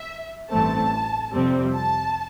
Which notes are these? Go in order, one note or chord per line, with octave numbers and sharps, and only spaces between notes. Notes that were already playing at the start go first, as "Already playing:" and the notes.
Already playing: E5
A1 G2 E3 A3 C4 A5
F2 C3 G3 C4
A5